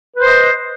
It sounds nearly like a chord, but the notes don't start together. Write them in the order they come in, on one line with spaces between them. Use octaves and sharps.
B4 C5 D#5